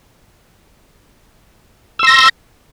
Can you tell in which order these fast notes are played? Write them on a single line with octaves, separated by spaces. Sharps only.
E6 C6 A#6